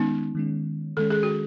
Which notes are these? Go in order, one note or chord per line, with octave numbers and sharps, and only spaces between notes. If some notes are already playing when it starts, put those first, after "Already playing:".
Already playing: D#3 G#3 B3 C#4 D#4
D#3 G#3 C#4
D#3 G#3 C#4 A4
G#4
F#4